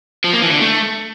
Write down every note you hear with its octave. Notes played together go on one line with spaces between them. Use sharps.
F3
A#3
E3
D3
A3